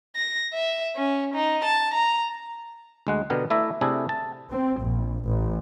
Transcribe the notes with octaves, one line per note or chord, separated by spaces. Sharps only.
A#6
E5
C#4
D#4
A5
A#5
D2 G#3 F#5
B2 D3 B3 G4 A#4
A3 E4 D5 E5 A#5
C3 A3 D4 E4 G#4 A4
A5
C4
A#1
A1